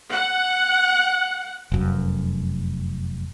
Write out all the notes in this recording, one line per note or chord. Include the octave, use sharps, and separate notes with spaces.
F#5
F1 F#2